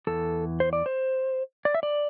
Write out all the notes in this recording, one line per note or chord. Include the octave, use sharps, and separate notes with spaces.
E2 E3 A4
C5
D5
C5
D5
E5
D5